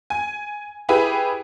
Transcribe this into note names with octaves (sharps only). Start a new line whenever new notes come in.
G#5
E4 G4 G#4 B4 G#5 B5